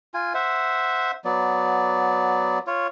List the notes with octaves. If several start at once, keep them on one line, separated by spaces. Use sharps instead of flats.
F4 G#5
C5 E5 F#5
F#3 B3 D5
F4 C#5